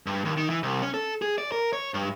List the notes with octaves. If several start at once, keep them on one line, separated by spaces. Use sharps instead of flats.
G2
D#2
D#3
E3
C2
C#4
A4
G#4
D5
A#4
C#5
G2